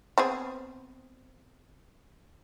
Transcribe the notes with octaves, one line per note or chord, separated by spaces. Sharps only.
B3 C4 G#4